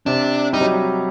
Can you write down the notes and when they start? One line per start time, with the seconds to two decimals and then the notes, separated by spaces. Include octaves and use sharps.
0.06 C3 D4
0.53 G3 D#4
0.61 F#3